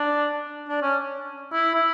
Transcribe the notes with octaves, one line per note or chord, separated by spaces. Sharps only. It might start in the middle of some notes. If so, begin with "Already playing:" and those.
Already playing: D4
D4
C#4
E4
E4